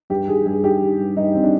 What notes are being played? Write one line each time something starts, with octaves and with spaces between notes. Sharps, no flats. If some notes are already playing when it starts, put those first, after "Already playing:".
G2 G4
D#3 G#4
G2 G#4
D#3 G4
D#3
G2
G2 D#4
D#3 C4
D4